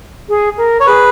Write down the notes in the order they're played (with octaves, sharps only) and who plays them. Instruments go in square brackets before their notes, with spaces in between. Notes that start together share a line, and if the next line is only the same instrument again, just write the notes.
[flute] G#4
A#4
[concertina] C#5
[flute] G#4 [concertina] B4